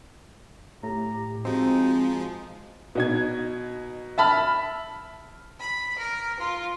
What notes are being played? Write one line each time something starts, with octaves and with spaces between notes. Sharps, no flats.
A2 G4 A#5
F3 G#3 C4 D#4 F#4
B2 D#4 G#6
E5 A5 B5 F6
B5
A#4
F4